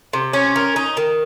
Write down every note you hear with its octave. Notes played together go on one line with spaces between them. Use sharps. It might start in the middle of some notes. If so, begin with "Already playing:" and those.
C3
C#4
A#4
D#4
D#3